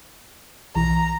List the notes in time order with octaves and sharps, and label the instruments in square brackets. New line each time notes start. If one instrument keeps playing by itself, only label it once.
[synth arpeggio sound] B1 E3 [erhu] A#5